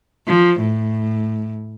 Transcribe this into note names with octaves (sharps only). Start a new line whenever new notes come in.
F3
A2